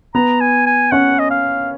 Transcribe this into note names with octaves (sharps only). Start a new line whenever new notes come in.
B3 A#5
G#5
G#5
C#4 F#5
D#5
F5